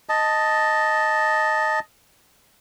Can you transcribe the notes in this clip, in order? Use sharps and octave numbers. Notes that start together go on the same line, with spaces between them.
D#5 A5